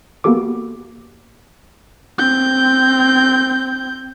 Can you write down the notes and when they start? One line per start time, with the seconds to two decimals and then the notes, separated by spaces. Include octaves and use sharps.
0.24 A#3 B3 F#4 G4 A4 D6
2.19 C4 G6